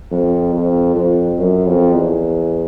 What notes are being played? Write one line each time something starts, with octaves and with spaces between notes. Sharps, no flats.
F2
F2
F2
F#2
F2
E2